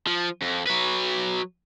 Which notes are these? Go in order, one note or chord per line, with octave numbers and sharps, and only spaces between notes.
F3
F2
F#3 B4